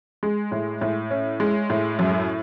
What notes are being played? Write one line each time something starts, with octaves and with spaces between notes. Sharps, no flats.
G#3
A2
A2
C#4
G#3
A2
F#2